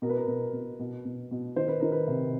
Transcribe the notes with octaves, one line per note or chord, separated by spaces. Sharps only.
B2 A#4
B4
A#4
B2
B2
B2
B2
B2
D#3 C5
B4
D#3 A#4
B4
C3